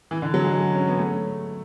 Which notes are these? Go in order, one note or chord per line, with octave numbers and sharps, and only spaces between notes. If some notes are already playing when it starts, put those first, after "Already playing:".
E3
D3
F#3
G#3
C#4
B3
A3